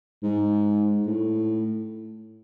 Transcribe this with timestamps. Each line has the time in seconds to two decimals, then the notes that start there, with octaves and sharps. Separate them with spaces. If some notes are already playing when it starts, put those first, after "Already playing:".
0.23 G#2
1.07 A2